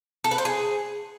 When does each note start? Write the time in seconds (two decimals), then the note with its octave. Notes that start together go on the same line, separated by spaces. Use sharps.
0.24 A4
0.31 B4
0.38 C5
0.45 G#4